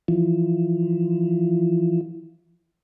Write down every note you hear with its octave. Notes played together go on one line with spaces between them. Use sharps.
E3 F3